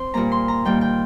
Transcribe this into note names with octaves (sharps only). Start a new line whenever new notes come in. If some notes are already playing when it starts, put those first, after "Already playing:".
Already playing: C4 C6
A#2 G3 A#3 A#5
C6
A#5
D#3 G3 A#3 G5
G5